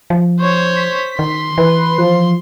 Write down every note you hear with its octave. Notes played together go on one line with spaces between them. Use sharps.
F3
C5 C#5
B6
D#3 C6
E3 B4
F3